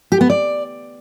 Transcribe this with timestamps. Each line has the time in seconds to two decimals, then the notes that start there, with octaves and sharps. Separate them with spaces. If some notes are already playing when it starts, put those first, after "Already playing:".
0.12 G4
0.21 B3
0.30 D5